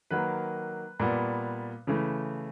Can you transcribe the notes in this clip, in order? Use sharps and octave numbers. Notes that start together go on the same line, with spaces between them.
D#3 F#3 A#3 B4
A#2 G3 B3
C#3 E3 A3